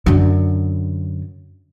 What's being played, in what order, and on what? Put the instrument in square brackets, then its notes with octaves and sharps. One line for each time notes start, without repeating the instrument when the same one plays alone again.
[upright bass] F#2 D3